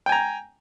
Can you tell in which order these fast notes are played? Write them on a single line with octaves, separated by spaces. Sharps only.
G5 G#5 A#5